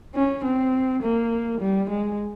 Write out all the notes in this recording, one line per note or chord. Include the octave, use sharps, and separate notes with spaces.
C#4
C4
A#3
G3
G#3